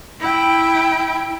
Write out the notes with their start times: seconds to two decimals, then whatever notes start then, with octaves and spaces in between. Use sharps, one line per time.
0.21 E4 G5